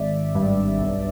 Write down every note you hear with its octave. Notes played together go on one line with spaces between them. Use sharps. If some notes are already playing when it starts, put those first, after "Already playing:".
Already playing: G#1 D5 E5
G2
B1